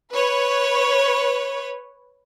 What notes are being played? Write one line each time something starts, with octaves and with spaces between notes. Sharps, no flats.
B4 C#5